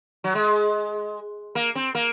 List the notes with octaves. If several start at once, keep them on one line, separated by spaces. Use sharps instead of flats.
F#3
G#3
A#3
C4
A#3